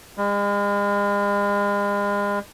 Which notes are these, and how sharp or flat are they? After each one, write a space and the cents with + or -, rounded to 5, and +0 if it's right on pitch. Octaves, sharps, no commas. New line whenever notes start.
G#3 -40